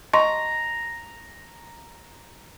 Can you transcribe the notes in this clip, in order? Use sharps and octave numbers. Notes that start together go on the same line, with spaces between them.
D#5 A#5 C6 C#6